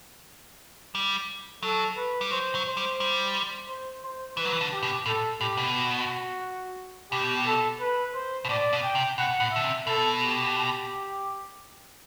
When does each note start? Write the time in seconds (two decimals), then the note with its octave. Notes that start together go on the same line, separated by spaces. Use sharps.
0.95 G3
1.63 F#3 A4
1.96 B4
2.21 G3
2.31 F#3 C5
2.55 F#3
2.66 C5
2.77 G3
3.00 G3
3.68 C5
4.03 C5
4.37 E3 B4
4.45 F#3
4.52 E3
4.61 D3
4.72 G4
4.83 B2
5.06 A2 A4
5.41 A2 G4
5.57 B2
5.74 F#4
7.11 B2 G4
7.47 A4
7.80 B4
8.15 C5
8.45 B2
8.49 A2 D5
8.73 B2
8.84 G5
8.95 C3
9.18 B2 F#5
9.40 A2
9.51 D3 E5
9.64 C3
9.87 B2 A4
10.21 G4